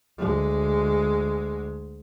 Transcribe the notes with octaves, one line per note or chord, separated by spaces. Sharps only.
D2 G#3